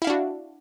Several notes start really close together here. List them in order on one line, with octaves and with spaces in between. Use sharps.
E4 F5 D4 F#4